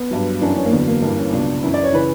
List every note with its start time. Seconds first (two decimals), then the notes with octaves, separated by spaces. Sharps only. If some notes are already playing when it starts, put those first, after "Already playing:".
Already playing: B3
0.11 G2 F#3
0.41 F#2 E3 D4
0.57 C#4
0.65 A#3
0.71 E2 D3 F#3 B3
0.88 A#3
1.02 G2 E3 A#3
1.17 C#4
1.32 C#2 B2 F#3 D4
1.63 F#2 E3 E4
1.74 D5
1.84 C#5
1.93 C#3 E3 B4